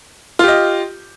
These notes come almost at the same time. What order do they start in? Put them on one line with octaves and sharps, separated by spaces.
F4 G4 D#5